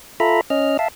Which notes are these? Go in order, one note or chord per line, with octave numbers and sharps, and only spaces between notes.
F4 A4 E5 A#5 B5
C#4 D#5 F6
E5 F5 A5